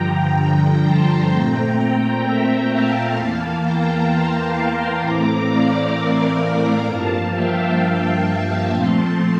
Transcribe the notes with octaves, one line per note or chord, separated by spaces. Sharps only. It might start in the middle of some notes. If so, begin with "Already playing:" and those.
Already playing: G2 D3 F3 G5 A#5
A5 C6
A#2 A3 C4 G5 A#5
E5 G5
F5 A5
E2 E3 A#3 F5 A5
G5 A#5
A5 C6
A2 E3 A3 C4 A#5 D6
D5 F5
A#4 D5
D5 F5
G2 F3 A#3 F5 A5
E5 G5
F5 A5
A#2 F3 A3 C4 A5 C6